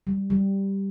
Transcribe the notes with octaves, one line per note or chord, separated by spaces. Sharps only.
G3
G3